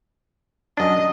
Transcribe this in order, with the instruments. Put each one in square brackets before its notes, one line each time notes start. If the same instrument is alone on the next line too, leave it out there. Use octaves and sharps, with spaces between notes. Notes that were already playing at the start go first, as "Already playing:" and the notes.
[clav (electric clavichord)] F#2 D4 [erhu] D#5